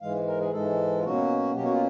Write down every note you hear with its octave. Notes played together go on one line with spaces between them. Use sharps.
G#2 E3 G#3 F5
A#4
G#4
G#2 E3 G#3 A4
F4
B2 F#3 A#3 C#4 F#4
B2 F#3 A#3 C#4 G4
F#4
F4